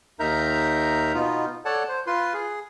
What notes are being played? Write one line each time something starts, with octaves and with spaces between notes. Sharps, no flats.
D#2 D#4 A#4 E5 A#5 G6
B2 B3 D#4 F4
A4 C#5 D5 F#5 A5
C5
F4 B4 C6
G#4